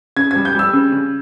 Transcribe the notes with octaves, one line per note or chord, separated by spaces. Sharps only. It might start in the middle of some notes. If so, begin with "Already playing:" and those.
C#3 G#6
G3 G#6
G6
G3 E6
C#3
C#3